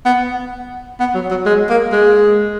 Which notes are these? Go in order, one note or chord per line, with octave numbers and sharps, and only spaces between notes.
B3
B3
F#3
F#3
G#3
A#3
G#3